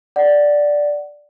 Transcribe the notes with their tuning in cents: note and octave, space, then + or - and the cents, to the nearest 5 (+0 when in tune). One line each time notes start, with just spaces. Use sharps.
D5 +0 F#5 +15